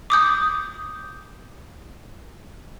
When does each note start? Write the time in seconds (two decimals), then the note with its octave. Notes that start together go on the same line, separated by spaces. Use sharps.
0.10 D6 D#6 G6